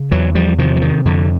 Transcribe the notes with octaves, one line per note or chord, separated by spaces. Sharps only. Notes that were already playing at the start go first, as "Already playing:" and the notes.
Already playing: C#3
E2 E3 F#3
F3 G3
C3 D#3 F3
E3
D#3
F2 D3